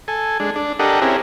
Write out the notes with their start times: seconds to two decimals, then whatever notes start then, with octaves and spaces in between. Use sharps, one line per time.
0.08 A4 G#5
0.40 G#3 D4
0.56 D4
0.79 D4 G4 A4 A#4 D#5 F#5
1.02 C4 C#4 E4 G4 G#4 A#4